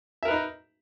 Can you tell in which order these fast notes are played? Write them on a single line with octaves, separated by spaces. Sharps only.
E5 A#4 B4 D#4